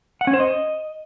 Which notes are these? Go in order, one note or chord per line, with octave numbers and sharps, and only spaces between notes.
F#5
C#4
C5
D#5